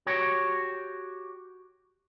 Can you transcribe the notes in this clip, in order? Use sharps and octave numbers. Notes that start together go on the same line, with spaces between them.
F#4 G4 C#5